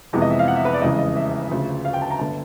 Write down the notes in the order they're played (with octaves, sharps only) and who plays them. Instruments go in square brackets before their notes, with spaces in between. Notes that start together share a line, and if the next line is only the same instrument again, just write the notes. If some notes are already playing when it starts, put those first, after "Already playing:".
[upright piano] F2 C3 E3 G#3 B3
D#5
E5
F5
F#5
E5
B4
D5
F1 E2 C#3 E3 G#3 D#5
D#5
E5
D2 C#3 F3
F5
G5
A5
A#5
G1 D3 A5